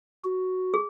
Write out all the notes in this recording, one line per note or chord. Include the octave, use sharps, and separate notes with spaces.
F#4
G#4